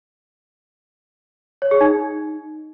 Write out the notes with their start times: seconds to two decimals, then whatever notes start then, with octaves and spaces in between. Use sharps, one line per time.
1.62 C#5
1.71 G#4
1.81 D#4